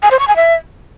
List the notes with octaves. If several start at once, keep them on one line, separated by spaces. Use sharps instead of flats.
G#5
C5
C#6
G#5
E5